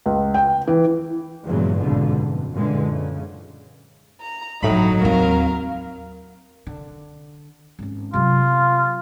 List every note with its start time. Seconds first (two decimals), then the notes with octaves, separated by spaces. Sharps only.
0.06 C#2
0.34 G5
0.67 E3
1.45 E2 G2 A#2 C#3 F#3 G#3
1.80 A#1 F2 G#2 B2 D3
2.19 F#1
2.56 F#2 A#2 D3 E3 G#3
2.93 C#3
4.20 A#5
4.63 G1 A2 F#3 D#4 B5
5.02 D#2 C4 A#4 F5
6.67 D3
7.79 G#1 C#4
8.14 C3 F#3 F4